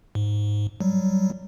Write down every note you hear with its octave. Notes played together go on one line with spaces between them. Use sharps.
G#2
F#3 G3